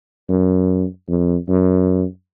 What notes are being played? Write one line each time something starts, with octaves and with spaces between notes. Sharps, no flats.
F#2
F2
F#2